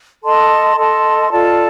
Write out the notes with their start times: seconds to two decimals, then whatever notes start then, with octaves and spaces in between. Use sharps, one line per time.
0.23 A4 D#5 A5 C6
0.77 A4 D#5 A5 C6
1.31 F4 A4 D5 A5